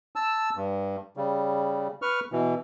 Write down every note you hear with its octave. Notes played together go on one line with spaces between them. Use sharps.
A5 E6
G2
C#3 G3
B4 C#6 F6
B2 E3